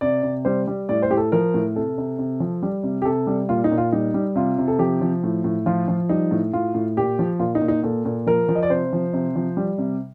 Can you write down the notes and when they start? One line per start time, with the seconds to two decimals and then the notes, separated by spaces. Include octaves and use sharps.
0.01 C3 D5
0.23 C3
0.45 G3 C5
0.67 G3
0.89 A2 D5
1.02 C5
1.10 A2 G4
1.17 A4
1.32 F3 A#4
1.54 A2
1.76 C3 A4
1.98 C3
2.18 C3
2.40 F3
2.63 G3
2.83 C3
3.02 G4
3.05 C3 A4
3.27 G3
3.49 A#2 F4
3.64 D#4
3.71 A#2
3.78 F4
3.92 G3 D#4
4.14 G3
4.35 C3 F4
4.58 C3
4.68 A4
4.79 F3 G4
5.01 F3
5.23 A2
5.44 A2
5.66 F3 F4
5.88 F3
6.09 G3 D#4
6.31 A2
6.53 A2 F4
6.74 A2
6.97 A#2 G4
7.19 F3
7.39 A#2 F4
7.55 D#4
7.61 A#2
7.68 D#4
7.83 A#2 A4
8.05 A#2
8.26 F3 A#4
8.49 F3
8.55 D#5
8.63 D5
8.70 C3 C5
8.93 F3
9.13 C3
9.36 F3
9.57 G3
9.78 C3